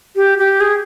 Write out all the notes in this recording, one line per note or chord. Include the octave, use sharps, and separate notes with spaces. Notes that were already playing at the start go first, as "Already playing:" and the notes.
G4
G4
G#4